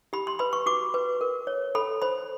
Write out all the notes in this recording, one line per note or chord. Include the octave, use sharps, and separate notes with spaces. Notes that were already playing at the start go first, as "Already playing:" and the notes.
G4 B5
C6
B4 B5
C#6
F#4 D6
B4
A#4
C#5
A4 B5
C5 B5